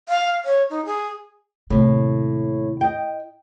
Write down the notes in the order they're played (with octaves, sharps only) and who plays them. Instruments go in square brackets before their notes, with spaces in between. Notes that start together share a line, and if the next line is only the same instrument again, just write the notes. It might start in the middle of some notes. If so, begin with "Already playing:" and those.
[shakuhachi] F5
C#5
D#4
G#4
[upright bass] D#2 C3 [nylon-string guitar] A2
[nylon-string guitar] D#5 G5